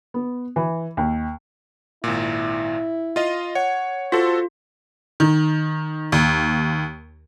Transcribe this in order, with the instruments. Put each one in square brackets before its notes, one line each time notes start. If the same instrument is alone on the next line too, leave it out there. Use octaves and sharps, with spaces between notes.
[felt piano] B3
E3
D#2
[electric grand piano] G#1 A#2 [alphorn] E4
[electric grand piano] F4 D#5 F5
[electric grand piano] C#5 [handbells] F#5
[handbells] F4 [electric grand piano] F#4 A4 [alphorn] C5
[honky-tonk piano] D#3
D#2